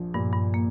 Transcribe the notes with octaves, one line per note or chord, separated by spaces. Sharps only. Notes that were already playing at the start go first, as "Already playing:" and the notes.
Already playing: A#1 F3
G2 A#2
G2
A#3